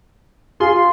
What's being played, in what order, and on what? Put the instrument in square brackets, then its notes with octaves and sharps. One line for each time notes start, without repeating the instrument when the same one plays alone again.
[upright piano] F4 G#4 [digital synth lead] C6